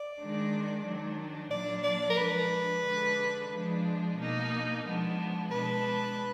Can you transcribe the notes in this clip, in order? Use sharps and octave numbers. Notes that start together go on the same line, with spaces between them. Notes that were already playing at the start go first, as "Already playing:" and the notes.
Already playing: D5
D#3 G#3 D4
D#3 F#3 D4
A#2 F#3 A#3 D4 D5
D5
A#4
F3 G#3 D4 B4
D3 G#3 D4
F3 G#3 D4
B2 A#3 D#4
F3 G#3 B3 D4
B2 G#3 D4 B4